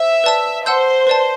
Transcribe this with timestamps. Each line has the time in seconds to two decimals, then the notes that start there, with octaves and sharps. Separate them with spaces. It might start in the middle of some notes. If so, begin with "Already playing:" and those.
Already playing: C5 E5
0.24 B4 D5 A5 E6
0.66 C5 F#5 A5 E6 G6
1.07 B4 D5 A5